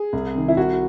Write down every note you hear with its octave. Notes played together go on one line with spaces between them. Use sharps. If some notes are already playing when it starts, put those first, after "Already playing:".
Already playing: G#4
C2
C3 D#3
E4
C2 F#4